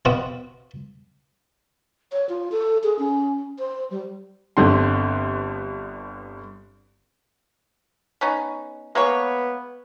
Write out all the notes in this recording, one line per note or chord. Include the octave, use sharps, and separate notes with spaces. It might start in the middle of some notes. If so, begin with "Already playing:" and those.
B2 B3 C4 F4 F#4
C#5
F4
A4
G#4
C#4
C5
G3
G1 G2 D3 C4 C6
B3 C#4 D#4
G#3 A#3 B3 C#5